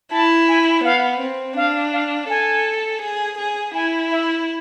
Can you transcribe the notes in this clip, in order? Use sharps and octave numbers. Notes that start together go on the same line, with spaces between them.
E4 A5
G#5
B3 F5
C4
D4 F5
F5
A4 G#5
G#4
G#4
E4 G#5
E5